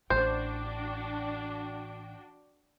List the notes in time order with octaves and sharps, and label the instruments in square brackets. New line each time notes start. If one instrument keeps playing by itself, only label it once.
[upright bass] A1 [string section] D4 F#4 G5 [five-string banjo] C5